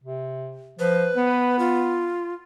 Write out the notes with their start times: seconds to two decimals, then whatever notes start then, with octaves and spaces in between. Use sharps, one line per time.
0.04 C3
0.79 F3 B4
1.15 B3
1.59 F4